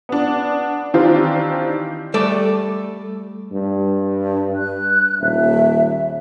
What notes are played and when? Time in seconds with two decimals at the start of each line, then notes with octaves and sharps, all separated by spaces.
0.09 B3 D4
0.94 D#3 E3 C4 D4 F4 G4
2.14 G3 A3 A4 D5
3.52 G2
4.55 F#6
5.21 D#1 E5